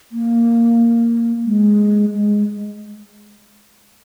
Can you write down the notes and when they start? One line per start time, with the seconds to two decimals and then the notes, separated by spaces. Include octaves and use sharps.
0.12 A#3
1.45 G#3
2.13 G#3